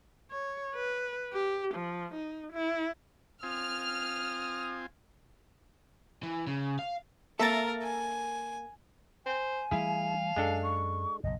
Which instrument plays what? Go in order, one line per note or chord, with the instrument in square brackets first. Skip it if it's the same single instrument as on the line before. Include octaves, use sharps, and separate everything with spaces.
[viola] C#5
B4
G4
F3
D#4
E4
[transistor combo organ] C4 F4 G#5 [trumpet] D#6 [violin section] F6
[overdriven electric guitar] E3
C#3
F5
[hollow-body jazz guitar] A#3 A4 [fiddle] A#4 [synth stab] E5 A#5 A6
[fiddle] G#5
[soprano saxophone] C5 [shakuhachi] G#5
[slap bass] E3 G3 A3 [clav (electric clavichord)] E4 G#4 [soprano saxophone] F5
[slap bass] F#2 [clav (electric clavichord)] G#3 D4 A4
[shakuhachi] C#6
[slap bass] F#1 B1 [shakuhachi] D#5